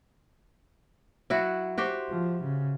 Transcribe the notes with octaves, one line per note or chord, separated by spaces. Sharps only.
F#3 E4 F#4
F#4 G4 C5
F3
C#3